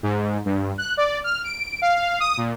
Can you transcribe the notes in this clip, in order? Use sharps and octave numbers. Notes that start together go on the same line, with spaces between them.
G#2
G2
F#6
D5
F6
D7
F5
D#6
A#2